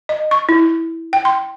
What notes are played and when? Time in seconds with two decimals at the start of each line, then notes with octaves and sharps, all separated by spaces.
0.09 D#5
0.31 C#6
0.49 E4
1.13 G5
1.25 C6